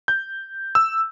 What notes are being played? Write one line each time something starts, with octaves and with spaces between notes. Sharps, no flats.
G6
E6